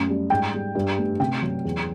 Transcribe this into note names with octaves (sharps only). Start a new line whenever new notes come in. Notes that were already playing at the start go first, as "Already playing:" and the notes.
Already playing: F#2 A3
G3
G#2 G5
G3
G2
A3
C3 G5
F#3
E2